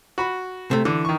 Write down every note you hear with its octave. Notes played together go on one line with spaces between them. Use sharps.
F#4 B5
C3 A3
D3 E3
D#3 C#6